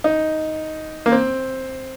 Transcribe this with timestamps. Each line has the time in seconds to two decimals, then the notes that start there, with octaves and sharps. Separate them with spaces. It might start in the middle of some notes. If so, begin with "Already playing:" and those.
0.04 D#4
1.06 A#3
1.12 C4